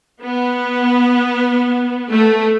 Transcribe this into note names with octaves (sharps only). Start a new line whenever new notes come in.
B3
A3